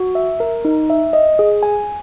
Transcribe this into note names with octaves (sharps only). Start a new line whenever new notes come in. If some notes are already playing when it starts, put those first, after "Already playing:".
Already playing: F#4
E5
A#4
D#4
E5
D#5
G#4
G#5